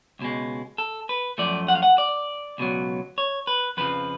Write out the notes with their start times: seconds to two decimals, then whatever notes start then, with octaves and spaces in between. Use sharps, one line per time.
0.19 C#2 B2 G#3
0.78 A4
1.09 B4
1.38 F#2 F3 A3 D5
1.68 F#5
1.75 F5
1.83 F#5
1.98 D5
2.58 C#2 B2 F#3
3.18 C#5
3.47 B4
3.77 F2 C#3 F3 B4